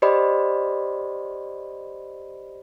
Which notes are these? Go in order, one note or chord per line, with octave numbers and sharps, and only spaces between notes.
G4 C5 D5 D#5 B5